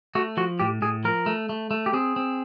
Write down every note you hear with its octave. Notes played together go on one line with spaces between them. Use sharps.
A3 F#4
F3 F#4
A2 G4
A2 G#4
F3 A#4
A3
A3
A3
G4
C4 G#4
C4